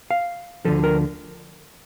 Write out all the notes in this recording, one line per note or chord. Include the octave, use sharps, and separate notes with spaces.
F5
D2 D3 F3 A4
A#4